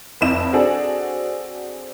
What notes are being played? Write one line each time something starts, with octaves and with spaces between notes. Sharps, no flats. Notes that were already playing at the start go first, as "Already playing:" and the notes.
F1 F2 E4 E7
C4 D4 F#4 G#4 A4